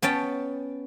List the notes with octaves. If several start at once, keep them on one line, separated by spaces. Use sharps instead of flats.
B3 C#4 G5 A5